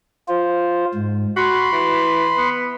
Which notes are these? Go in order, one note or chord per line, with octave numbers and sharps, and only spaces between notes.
F4 C5
G#2
F#4 B5 C6
E3
B3